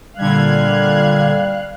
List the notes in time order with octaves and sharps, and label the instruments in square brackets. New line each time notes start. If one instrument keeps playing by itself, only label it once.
[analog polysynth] A#2 D3 G#6 [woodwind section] G3 [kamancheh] F5 F#6